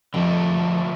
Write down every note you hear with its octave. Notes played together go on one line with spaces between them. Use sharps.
F2 D3 F3 A3